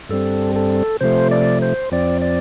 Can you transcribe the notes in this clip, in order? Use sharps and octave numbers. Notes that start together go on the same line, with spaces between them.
G2 G3 C4 A4
A4
C3 F3 A3 C5
D5
C5
F2 F3 C4 D5
D5